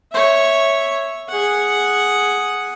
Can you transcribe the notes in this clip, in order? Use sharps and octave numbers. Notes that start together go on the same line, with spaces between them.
C#5 E5
G#4 F#5